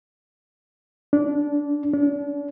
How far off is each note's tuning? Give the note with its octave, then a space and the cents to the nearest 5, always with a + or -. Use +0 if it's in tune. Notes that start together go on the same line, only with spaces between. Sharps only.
D4 -20
D4 -40